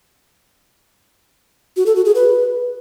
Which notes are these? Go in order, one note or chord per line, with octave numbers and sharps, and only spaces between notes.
F#4
A4
F#4
G#4
B4